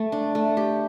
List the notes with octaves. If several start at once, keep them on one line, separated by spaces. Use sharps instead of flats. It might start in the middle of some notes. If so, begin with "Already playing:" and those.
Already playing: A3
D4
A3
G4